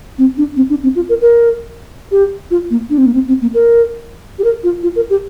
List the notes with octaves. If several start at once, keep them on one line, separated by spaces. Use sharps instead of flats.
C4
D4
C4
D4
C4
F4
A#4
A#4
G4
F4
A#3
D4
C4
A#3
C4
C4
A#3
A#4
G4
A#4
F4
F4
A#4
G4